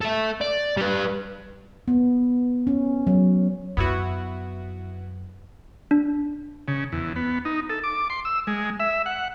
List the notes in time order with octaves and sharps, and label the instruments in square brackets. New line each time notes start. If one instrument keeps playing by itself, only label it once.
[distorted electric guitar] A4 E5
D5
G3 B4
[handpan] B3
C#4
F#3
[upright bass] F#2 [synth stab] B3 E4 F#4
[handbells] D4
[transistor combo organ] C#3
E2
B3
D#4
A4
D6
C6
E6
G#3
E5
F#5